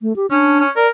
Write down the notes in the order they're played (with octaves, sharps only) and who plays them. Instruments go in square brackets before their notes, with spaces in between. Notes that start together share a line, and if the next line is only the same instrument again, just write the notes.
[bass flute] A3
G4
[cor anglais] C#4 [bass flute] D4
[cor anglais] C#4
[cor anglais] A#4 [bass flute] D5